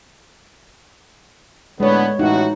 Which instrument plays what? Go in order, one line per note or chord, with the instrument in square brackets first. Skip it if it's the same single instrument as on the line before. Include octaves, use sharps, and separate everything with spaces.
[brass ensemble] A2 D3 B3 [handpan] G#3 C#5
[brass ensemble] A1 A2 F#4 [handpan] D#4